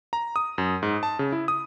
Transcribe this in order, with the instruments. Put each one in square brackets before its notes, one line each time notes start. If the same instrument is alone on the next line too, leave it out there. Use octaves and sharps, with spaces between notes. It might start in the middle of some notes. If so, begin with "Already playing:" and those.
[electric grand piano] A#5
D#6
F#2
G#2
A5
C#3
E4
D#6